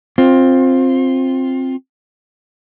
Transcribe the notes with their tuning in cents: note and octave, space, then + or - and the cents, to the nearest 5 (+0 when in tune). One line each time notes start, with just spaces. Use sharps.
C4 +10 F4 +15